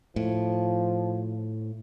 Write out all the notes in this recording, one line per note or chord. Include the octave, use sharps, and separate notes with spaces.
A2 F3